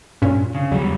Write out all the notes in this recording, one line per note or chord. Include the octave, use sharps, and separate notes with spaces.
G2 A#2 C#4
C#3
E2 F#3 G3